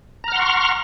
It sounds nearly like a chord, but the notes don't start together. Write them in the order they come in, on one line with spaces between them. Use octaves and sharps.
A#5 F6 F#5 C6 C#6